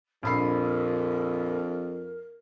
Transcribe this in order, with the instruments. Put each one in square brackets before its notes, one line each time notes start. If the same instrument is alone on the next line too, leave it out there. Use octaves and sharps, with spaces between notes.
[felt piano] A#1 B5 C7 [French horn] F2 [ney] A#4